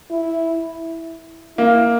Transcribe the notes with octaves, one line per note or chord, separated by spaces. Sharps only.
E4
A#3 E4